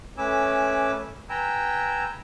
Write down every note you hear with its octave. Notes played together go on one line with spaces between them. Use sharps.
A3 C#4 B4 G#5 D6 E6
B4 G5 G#5 A#5 E6